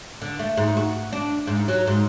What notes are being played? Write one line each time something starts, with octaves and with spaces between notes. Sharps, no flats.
D3
A3
G#2
F#4
D4
G#2
F#3
G#2